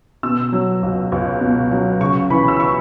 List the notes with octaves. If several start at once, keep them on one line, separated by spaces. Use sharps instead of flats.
B2 E6
F#3
C#2
C#2
B2
F#3
C#3 C#6
E3 B5
E6
C#6